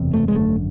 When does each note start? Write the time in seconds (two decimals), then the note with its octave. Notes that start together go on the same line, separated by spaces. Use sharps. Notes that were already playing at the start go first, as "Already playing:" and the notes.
Already playing: F#1 E2 C3
0.14 A3
0.28 G#3
0.35 G#1 F#2 D3 A3